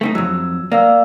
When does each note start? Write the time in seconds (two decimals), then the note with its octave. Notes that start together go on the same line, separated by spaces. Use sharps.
0.01 A3 C4 D#4
0.15 F2 F#3 E6
0.72 A#3 D5 F5 E6